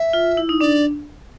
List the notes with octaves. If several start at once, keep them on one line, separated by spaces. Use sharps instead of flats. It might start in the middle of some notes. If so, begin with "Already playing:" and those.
Already playing: E5
F4
E4
D#4
D4 D5